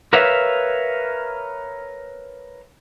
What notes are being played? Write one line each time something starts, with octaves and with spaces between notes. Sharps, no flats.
A#4 B4 C#5 E5 F5